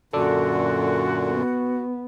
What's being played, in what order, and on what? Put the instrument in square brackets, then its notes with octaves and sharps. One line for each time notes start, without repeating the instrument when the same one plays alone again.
[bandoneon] F#2 A#2 D3 [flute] F#4 [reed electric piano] A4 D5 E6
[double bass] B3